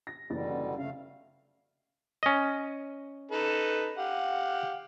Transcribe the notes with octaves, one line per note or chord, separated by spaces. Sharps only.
A#6
F#1 B2 D3 E3 G3 A6
F2 C#3 A3 F5
C#4 D#5
D#4 A4 B4
G4 F5 F#5